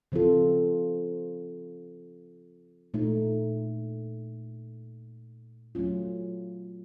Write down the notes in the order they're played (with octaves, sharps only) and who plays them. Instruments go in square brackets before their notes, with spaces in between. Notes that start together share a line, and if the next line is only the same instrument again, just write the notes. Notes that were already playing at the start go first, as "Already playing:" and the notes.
[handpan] C#3 F3 C4 F4 A4
A#2 A3 D#4
F#3 A3 C#4 F4